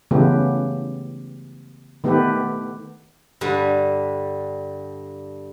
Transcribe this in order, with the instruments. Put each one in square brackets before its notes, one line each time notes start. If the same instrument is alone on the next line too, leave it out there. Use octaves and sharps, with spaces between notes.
[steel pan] C#3 E3 A3 B3 G4
D#3 A3 B3 G4 A4 B4
[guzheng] G2 D3 G3